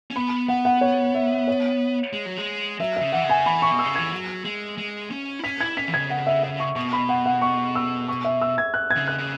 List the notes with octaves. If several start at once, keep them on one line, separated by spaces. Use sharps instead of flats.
C#4
B3 B5
B3 F#5
F#5
C#5
E5
C#5
G#3
F#3
G#3
F#3 E5
E5
C#3
E3 F#5
C#3
G#5
E3 B5
C#6
B2
E6
C#3
E3 G#6
F#3
G#3
G#3
C#4
E4
C#4 B6
E4 G#6
C#4 B6
E3
C#3 G#6
F#5
E5
E5
C#6
B2 C#6
B5
F#5
F#5
C#6
E6
C#6
E5
E6
G#6
F#6
G#6
C#3
F#6
C#3